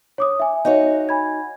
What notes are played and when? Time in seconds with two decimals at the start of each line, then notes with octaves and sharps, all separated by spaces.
0.18 C#5 D6 D#6
0.40 E5 G#5
0.65 D#4 F#4 C#5
1.09 G#5 B5 G#6